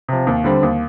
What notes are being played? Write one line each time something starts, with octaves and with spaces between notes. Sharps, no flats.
C3 F3
D#2
D3 G3 C4
D#2